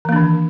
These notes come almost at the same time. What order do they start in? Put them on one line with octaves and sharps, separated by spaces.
E3 A#3 D4 D#3